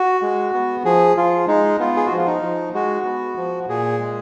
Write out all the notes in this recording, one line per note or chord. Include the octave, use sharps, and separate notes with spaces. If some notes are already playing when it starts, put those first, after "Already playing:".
Already playing: F#4
G#3
B3
F3 G#4
F3 F4
G#3 D#4
B3 F4
G#4
F#4
F3
F4
D#4
F3
G#3 F#4
B3
F3
A#2 G#4
G#3